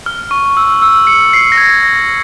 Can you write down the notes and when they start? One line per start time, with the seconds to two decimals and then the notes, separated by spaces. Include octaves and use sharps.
0.06 F6
0.31 C#6
0.57 E6
0.82 E6
1.07 C#7
1.33 C7
1.52 A#6
1.58 G#6
1.83 A#6